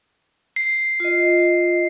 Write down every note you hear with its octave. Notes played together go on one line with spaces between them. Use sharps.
C7
F4 D#5